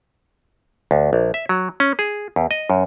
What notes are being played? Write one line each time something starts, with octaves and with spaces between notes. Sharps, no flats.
D2
A#1
E5
F#3
C#4
G#4
E2
D#5
F#2